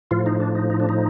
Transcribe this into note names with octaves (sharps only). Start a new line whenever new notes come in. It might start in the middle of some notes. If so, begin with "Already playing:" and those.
A2 F3 F4
D#4
D4
D#4
D#4
D4
D#4